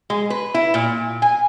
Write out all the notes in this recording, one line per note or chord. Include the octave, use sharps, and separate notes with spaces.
G#3
B4
E4
A#2
G#5